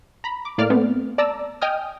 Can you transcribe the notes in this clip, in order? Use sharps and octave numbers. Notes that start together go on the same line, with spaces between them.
A#5 B5
D6
A2 A#3 D5 D6 F6
A3 B3 C4
D5 A5 A#5 D6 E6
D#5 G5 G#5 D#6 F6